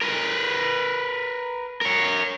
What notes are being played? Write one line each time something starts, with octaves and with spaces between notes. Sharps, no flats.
A#4 B4
A#4 C#5